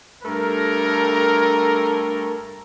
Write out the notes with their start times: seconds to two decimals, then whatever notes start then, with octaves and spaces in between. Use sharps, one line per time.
0.23 G2 A3 A4 A#4